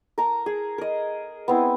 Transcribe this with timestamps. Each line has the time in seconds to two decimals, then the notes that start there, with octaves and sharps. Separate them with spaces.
0.18 A#4 A5 A#5
0.46 G#4
0.78 A#4 D#5
1.48 B3 C4 E4